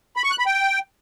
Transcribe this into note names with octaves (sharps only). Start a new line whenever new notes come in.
B5
C#6
F#6
B5
G5